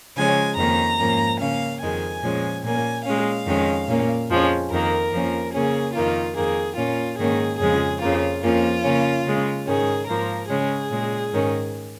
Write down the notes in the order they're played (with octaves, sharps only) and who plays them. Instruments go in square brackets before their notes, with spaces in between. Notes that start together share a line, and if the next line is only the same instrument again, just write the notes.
[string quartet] C#3 F3 G#3 C#4 G#5
F2 D#3 A#3 C#4 A#5
G#2 F3 A#3 C#4
C#3 A#3 C#4 F5
F2 D#3 G#3 G#5
A#2 F3 G#3 C#4
A#2 A#3 C#4 G#5
A#2 G#3 C#4 F5
F2 D#3 G#3 C#4
A#2 A#3 C#4
F2 F3 G#3 C#4
F2 D#3 A#3 A#4
F2 F3 A#3 C#4
C#3 A#3 C#4 G#4
F2 D#3 A#3 F4
F2 D#3 A#3 G#4
A#2 A#3 C#4 F4
G#2 D#3 A#3 C#4 G#4
F2 C#3 F3 G#3 C#4 G#4
F2 C#3 A#3 F4
F2 F3 A#3 C#4 F4
C#3 A#3 C#4
C#3 G#3 C#4
G#2 D#3 C#4 G#4
G#2 F3 A#3 A#4
C#3 G#3 C#4 G#4
A#2 G#3 C#4
G#2 D#3 C#4